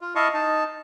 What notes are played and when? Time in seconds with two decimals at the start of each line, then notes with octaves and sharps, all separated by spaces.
0.01 F4
0.15 E4 D#5 F5 A5 C#6
0.34 D#4 A5